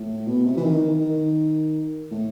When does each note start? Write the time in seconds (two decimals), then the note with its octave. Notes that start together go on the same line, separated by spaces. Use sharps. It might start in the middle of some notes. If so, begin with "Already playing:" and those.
Already playing: A2
0.27 B2
0.45 C3
0.57 E3
0.64 D#3
1.00 D#3
2.11 A2